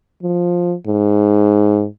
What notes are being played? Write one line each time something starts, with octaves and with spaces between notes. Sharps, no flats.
F3
G#2